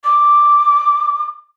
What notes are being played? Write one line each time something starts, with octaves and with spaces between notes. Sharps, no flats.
D6